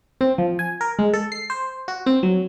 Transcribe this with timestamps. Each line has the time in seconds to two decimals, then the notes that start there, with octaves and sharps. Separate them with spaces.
0.21 C4
0.38 F3
0.59 G#5
0.81 A#4
0.99 G#3
1.13 A4
1.32 C7
1.50 C5
1.88 F#4
2.06 C4
2.23 F#3